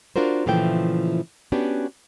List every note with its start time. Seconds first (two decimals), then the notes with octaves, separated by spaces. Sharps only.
0.16 D4 F4 F#4 A#4 C5
0.46 A#2 C#3 E3 F3 A3 G5
1.52 B3 C#4 D4 F#4 G4